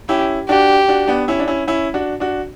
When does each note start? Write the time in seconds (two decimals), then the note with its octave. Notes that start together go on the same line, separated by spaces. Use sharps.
0.09 C#4 E4 G4
0.48 D4 F#4 G4
0.88 D4 F#4
1.08 B3 D4
1.28 C#4 E4
1.40 D4
1.47 C#4 E4
1.67 C#4 E4
1.94 D4 F#4
2.20 D4 F#4